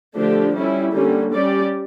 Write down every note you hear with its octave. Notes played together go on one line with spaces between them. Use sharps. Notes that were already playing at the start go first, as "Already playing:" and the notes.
D3 F3 A3 D4 G4
G3 C#4 E4
D3 G3 A#3 C#4
G3 C#4 G4 D5